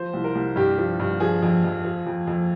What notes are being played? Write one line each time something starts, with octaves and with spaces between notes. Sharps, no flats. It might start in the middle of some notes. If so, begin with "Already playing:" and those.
Already playing: F3 C5
C2
A#4
C2
G2 G4
F3
G2
F3 G#4
F2
F2
F3
F2
F2